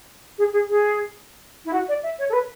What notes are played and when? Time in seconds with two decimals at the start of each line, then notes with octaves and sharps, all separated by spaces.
0.38 G#4
0.53 G#4
0.69 G#4
1.65 E4
1.73 F#4
1.89 D5
2.03 E5
2.19 C#5
2.29 A4
2.33 B4